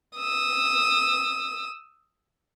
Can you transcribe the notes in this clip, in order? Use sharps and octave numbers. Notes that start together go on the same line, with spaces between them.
D#6 E6